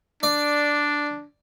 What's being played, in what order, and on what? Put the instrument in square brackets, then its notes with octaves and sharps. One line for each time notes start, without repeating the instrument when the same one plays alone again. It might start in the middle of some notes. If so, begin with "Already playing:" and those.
[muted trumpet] D4 [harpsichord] D5